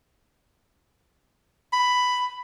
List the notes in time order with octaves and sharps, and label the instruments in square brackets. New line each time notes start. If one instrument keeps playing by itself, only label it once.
[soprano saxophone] B5